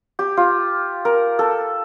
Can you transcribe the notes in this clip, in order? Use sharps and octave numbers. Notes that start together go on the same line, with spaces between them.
G4
F4
A#4
A4